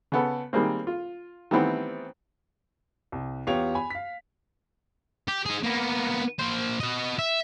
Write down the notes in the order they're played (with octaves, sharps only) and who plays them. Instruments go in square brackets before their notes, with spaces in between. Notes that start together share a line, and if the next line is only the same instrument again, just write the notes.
[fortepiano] C#3 B3 A4
D#3 G3 G#3 A#3 C4
F4
D#3 E3 G3 A3 B3 C4
[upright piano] C2
E2 B3 F4 G4 C#5 F7
G#5 B5
F5 B6
[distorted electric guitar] G4
D#4 G#4
A#3 B3
A#3 C5
F#4 D#5
E5